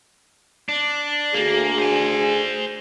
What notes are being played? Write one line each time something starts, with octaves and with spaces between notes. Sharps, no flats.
D4
D2 A#3 G#4
C5 G#5